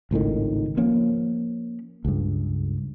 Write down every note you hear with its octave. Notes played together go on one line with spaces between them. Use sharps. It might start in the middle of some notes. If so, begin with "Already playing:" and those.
G#1 C#2 A2 D#3
F3 A#3 C#4
C#2 G2